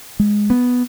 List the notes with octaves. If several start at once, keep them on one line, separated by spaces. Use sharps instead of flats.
G#3
B3